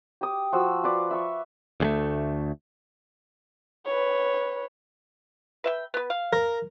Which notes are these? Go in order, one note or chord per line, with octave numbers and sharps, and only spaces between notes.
G4 D6 D#6
F3 F#4 E6
F4 B4 D5
E5 C#6
D2 G#3 A3
B4 C#5
B4 E5 G5
B3 B4
F5
A#4